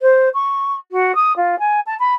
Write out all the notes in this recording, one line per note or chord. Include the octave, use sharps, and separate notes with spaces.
C5
C#6
F#4
D#6
F4
G#5
A5
B5